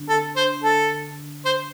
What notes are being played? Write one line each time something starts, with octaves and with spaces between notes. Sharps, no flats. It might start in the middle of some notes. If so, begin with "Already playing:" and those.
Already playing: D3 D4
A4
C5
A4
C5